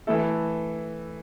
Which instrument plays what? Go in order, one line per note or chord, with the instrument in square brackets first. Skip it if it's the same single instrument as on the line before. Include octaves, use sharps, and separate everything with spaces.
[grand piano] E3 A3 E4 A4